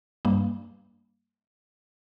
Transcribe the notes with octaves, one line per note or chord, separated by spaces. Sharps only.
G2 G3 A#3